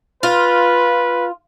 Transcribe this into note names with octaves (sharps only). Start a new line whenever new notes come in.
F4 B4